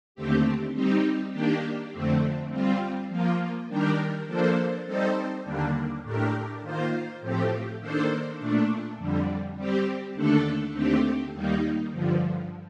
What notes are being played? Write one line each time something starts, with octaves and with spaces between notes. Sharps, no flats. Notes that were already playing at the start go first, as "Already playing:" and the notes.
D#2 D3 A3 C4 G4
G3 C4 D#4 G4
D#3 A#3 D4 G4
F2 D3 A3 C4
G3 C4 F4
F3 A#3 F4
D#3 G3 D4 G4 A#4
F3 A#3 D4 A4 C5
G3 C4 D#4 A4 C5
D#2 D3 G3 A#3 D4
A2 A3 D4 G4 A#4
D#3 A#3 F4 C5
A2 F3 A3 C4 G4
D#3 A#3 D4 A4 C5
A#2 A3 D4
F2 D3 G3
G3 C4 G4
D#2 D3 A3 D4 A4
D#2 D3 A3 C4 G4
D#2 D#3 G3 A#3 D#4
G2 D3 F3